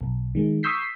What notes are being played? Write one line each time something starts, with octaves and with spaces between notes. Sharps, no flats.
B1
D#3 G#3
C#6 D#6 E6 G6 B6 C7